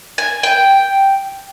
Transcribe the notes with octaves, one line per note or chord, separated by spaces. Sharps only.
G#5
G5